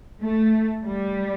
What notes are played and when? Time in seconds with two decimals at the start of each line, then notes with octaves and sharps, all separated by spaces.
0.21 A3
0.85 G3